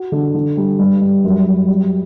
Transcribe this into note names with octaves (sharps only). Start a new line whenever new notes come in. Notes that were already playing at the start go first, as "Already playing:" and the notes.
Already playing: F#4
D3
D3
G3
G2
G2
F#2
F#2
G3